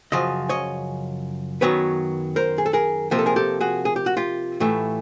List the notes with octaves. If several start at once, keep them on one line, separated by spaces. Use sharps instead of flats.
F#2 C#3 F3 D#5
C#5 D#5
F#2 D#3 F#3 B3 B4 C#5
A#4 C5
G#4
A4
G#4 A#4
C3 F3 A#3 A#4
A4
G#4 A#4
G4 A4
F#4 G#4
G#4
G4
F#4
F4 G4
A2 E3 A3